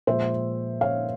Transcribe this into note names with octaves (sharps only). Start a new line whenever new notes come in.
A#2 F3 G#3 C5 E5
C#5 F5